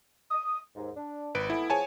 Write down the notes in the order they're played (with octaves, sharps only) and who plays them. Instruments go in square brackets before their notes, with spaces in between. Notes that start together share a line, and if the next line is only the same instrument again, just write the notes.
[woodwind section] D#6
D#2 G#2
D4
[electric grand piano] G#1 B4 D7
[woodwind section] E3 A3 B3 [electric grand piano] E4
[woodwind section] F3 B3 G#4 [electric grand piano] C#5 G#5 A5